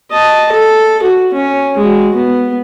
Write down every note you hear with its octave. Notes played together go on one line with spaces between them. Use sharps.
D#5 A5
A4
F#4
C#4
G#3 F#4
B3